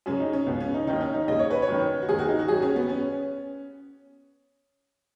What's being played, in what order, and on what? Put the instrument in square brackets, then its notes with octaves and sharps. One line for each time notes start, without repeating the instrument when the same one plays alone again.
[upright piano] F#2 C#3 C#4
D#4
C#4
C#2 B2 B3
C#4
D#4
D#2 D#3 D#4
C#4
D#4
D#2 C#3 D#5
C#5
B4
C#5
F#2 D#3
F#4
D#2 D#3 G#4
F#4
D#4
F#4
F#2 D#3 G#4
C#4
B3
C#4